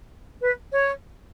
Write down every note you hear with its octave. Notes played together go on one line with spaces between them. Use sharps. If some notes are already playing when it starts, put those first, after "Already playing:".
B4
C#5